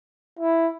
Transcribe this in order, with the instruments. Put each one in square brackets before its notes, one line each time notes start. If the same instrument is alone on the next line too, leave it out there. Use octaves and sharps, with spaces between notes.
[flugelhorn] E4